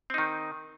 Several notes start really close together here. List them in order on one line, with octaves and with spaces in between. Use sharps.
C4 D#4 D#3